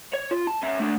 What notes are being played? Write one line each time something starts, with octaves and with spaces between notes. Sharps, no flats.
C#5
F4
A5
C#4 E5
A3 D4